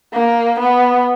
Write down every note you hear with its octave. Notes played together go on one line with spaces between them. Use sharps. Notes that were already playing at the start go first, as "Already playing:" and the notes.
A#3
B3